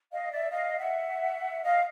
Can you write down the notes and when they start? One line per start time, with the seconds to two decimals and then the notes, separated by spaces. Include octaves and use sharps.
0.12 D#5 F5
0.31 D5 E5
0.49 D#5 F5
0.78 E5 F#5
1.63 D#5 F5